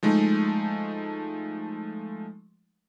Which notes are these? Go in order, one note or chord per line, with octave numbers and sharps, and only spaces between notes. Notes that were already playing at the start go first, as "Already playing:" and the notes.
F3 G#3 A3 D#4